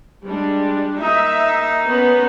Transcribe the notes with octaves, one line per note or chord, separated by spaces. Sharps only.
G3 G#3 D4
A#3 D#4 E5
B3 C#4 B4